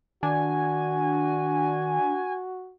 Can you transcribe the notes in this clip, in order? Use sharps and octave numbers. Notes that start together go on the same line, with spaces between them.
D#3 D4 F#4 G#5